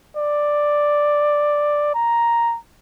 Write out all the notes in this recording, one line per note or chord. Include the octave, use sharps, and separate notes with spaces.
D5
A#5